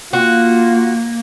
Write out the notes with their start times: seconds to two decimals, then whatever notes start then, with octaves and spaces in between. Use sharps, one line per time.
0.13 A#3 F4 F#4